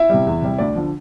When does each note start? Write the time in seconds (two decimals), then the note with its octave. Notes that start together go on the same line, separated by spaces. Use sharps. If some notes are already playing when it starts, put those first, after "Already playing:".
Already playing: E4 E5
0.09 C3 G3
0.27 E2
0.42 C3 G3
0.58 D2 D5
0.75 D3 F3